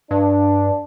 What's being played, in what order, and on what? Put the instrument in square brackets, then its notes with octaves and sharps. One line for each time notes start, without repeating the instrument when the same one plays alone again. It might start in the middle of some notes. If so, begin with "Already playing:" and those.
[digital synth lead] G2 [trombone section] D4